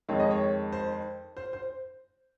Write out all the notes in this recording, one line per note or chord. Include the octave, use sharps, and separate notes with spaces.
F2 D#3 G#3 C#5
D#5
C#5
C5
C5
C5